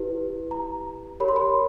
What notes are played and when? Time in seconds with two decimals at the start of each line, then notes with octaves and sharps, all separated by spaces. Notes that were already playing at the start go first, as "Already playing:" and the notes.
Already playing: E4 G4 B4
0.51 A#5
1.20 G4 A#4 C#5 B5
1.28 C6
1.36 B5